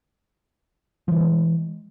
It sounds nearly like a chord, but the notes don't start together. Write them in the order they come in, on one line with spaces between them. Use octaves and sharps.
F3 E3 G3 G#3